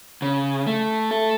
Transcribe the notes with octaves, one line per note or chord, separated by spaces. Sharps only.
C#3
A3
A4